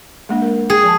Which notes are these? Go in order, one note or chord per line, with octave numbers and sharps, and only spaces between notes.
G#3 A#3 D4
A#4
G#4 G5
F3 G#5 A5